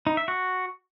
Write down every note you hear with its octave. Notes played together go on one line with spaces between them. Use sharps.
D#4
E5
F#4